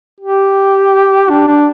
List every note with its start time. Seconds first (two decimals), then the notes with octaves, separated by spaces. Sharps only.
0.20 G4
1.30 D4
1.48 D4